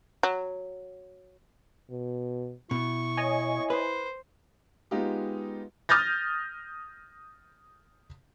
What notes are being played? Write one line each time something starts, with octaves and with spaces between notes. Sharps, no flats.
F#3
B2
B2 E4 C#6
C#5 D#5 G#5
B4 C5
G#3 B3 D#4 F4 G4
D#6 F6 G6 A6 A#6